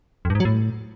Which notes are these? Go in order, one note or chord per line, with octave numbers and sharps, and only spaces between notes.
F2
G2
G#2
F#3
A2